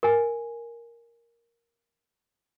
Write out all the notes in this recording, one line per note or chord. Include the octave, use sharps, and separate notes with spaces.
A#4 G#5